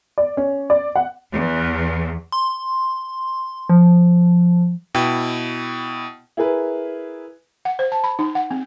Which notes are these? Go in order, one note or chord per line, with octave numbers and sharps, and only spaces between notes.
D5
C#4
D5
F#5
E2
C6
F3
B2 E4 G5
E4 G#4 A#4 B4
F#5
C5
A5
B5
D#4
F#5
C4